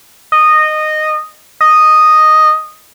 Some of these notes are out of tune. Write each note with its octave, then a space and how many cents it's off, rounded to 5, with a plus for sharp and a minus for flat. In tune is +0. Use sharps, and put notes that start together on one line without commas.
D#5 -15
D#5 -5